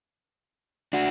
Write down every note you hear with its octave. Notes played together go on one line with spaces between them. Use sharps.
D4 F#4